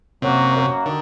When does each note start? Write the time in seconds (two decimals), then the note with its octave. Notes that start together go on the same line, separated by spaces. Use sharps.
0.22 F#2 C3 F#3 A#3 F#4
0.54 F#2 F#3 A#3 F#4
0.86 D3 D#3